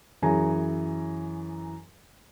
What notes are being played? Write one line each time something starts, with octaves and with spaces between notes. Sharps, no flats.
F#2 E3 G#4 G#5 A#5